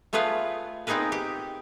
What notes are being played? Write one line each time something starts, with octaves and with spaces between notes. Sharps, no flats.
A3 B3 F4 G#4 B4 F5
B3 C4 D#4 G#4 A#4 B4
G4